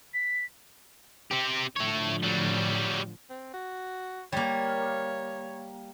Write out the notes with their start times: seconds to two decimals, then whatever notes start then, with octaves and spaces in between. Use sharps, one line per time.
0.13 B6
1.31 C4 G4
1.76 A2 D3 F3 A3 C#5
2.23 F#3 G3
3.30 C4
3.53 F#4
4.32 G3 A#3 C#5